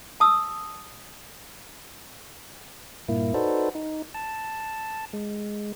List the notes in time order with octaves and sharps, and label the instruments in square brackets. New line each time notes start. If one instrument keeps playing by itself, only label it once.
[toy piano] A5 D#6 E6
[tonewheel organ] G2 A#2 A#3 E4
D#4 F#4 A4 B4 C5 D5
D#4
A5
G#3